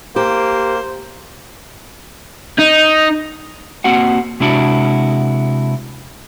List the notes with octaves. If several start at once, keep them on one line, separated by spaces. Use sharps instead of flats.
A#3 G4 C5
D#4
A#3 C4 F#4 F#5
C3 G#3 D4 E4 F#4